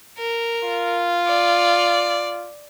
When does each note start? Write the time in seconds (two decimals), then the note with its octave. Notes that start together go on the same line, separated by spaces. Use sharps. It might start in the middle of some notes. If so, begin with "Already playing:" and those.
0.18 A#4
0.64 F4
1.27 D5